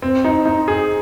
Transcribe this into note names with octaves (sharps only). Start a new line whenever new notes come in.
C4
D#4
D#4
G#4